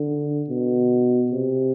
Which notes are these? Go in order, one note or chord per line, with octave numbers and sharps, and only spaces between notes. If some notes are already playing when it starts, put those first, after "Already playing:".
Already playing: D3
B2
C3